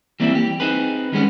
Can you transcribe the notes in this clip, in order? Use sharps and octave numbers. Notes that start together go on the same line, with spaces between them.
E3 G3 A#3 C4 E4
G4
C4 D#4 G#4 B4
D#3 G3 G#3 B3 C#4